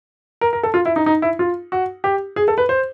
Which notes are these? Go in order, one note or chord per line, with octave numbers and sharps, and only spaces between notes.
A#4
A#4
A4
F4
E4
D#4
D#4
E4
F4
F#4
G4
G#4
A4
B4
C5